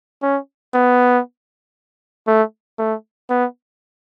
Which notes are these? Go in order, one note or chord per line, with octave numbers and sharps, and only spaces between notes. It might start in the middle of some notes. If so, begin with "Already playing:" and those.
C#4
B3
A3
A3
B3